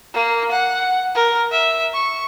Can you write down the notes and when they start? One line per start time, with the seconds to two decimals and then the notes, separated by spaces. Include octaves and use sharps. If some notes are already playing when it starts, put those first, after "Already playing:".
0.14 A#3
0.51 F#5
1.15 A#4
1.52 E5
1.94 C#6